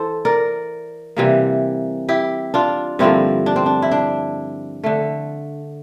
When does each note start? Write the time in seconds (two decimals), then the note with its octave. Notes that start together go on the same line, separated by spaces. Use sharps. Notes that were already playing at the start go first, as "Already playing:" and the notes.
Already playing: E3 A4 C5
0.25 A#4 D5
1.17 C3 E3 G3 A#3
2.09 E4 G4
2.54 D4 F4
2.99 G2 D3 F3 A#3 C4 E4
3.46 D4
3.56 C4
3.66 D4
3.82 E4
3.91 D4
4.84 D3 A3